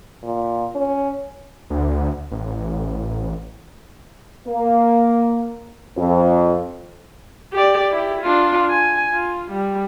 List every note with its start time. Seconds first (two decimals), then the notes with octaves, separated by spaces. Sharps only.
0.23 A#2
0.75 C#4
1.70 D2
2.32 A1
4.47 A#3
5.96 F2
7.53 G4 D5
7.91 E4 G4
8.22 D4 F4
8.70 G#5
9.13 F4
9.51 G3